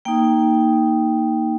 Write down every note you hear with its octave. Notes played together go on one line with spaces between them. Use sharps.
A#3 D#4 G5